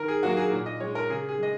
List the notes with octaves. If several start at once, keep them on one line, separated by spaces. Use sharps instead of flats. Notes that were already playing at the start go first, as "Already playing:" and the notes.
Already playing: D#3 A#4
G#4
F#3 A#3 F#4
G#4
A#2
D#5
G#3 C#5
A#4
C#3 G#4
G#4
G#3 D#5